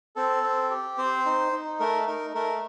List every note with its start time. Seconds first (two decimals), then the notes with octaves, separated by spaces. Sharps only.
0.16 C4 A4
0.43 C4
0.71 G4
0.98 C4 C5
1.26 D#4
1.52 D#4
1.80 A3 A#4
2.07 D#4 A#4
2.34 A3 A#4